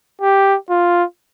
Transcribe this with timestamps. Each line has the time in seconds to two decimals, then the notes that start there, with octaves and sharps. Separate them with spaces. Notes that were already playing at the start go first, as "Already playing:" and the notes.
0.22 G4
0.70 F4